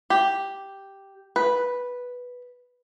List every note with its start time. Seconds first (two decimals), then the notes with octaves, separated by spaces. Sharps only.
0.10 G4
1.36 B4